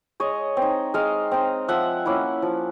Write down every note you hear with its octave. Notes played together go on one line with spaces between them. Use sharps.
G#3 C#5 D#5
C4 D#4
G#3 D#5 F5
C4 D#4
F3 E5 F#5
A#3 C#4 E4
F3